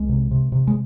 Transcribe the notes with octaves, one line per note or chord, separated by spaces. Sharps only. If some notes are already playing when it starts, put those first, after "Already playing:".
Already playing: C2 G#3
C3
C3
C3
G#3